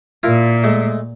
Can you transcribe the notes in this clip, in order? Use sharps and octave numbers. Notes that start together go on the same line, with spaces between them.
A#2 E4 F4 A#4
G#3 A3